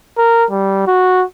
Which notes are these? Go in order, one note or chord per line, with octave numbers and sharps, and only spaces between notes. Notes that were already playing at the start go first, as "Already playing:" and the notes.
A#4
G3
F#4